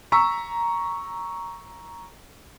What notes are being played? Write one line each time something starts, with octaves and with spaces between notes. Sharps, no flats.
A#5 C#6 E6 B6